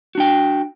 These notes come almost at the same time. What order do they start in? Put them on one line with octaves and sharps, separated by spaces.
F#4 D4 G5